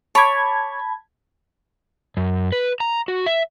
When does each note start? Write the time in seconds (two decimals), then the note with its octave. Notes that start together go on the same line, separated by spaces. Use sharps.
0.15 C#5 A5 B5 D6 G#6
2.17 F#2
2.52 B4
2.80 A#5
3.08 F#4
3.26 E5